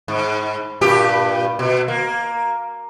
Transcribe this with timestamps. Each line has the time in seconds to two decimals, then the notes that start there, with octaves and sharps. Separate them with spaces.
0.08 G#2
0.81 G2 A#2 G4
1.59 B2
1.88 A#3